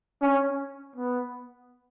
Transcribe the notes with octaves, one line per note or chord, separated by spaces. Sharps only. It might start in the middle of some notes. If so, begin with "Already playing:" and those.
C#4
B3